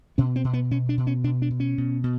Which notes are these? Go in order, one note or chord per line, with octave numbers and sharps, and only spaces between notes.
B2 C#4
C4
B2
B3
B2 C#4
D4
B2
C#4
B2 D4
D4
B2
C#4
B2
B2